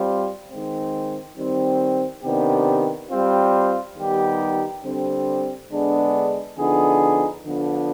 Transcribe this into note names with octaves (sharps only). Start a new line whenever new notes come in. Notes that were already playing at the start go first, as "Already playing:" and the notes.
Already playing: G3 C4 F4
D#3 G#3 C4
D#3 G3 C4
C3 D#3 B3 D4 G4
G3 C4 F4
D#3 G3 B3 D#4 G4
D3 G3 C4
D3 G#3 B3 D4 G#4
D3 F3 B3 D#4 G#4
D3 F3 B3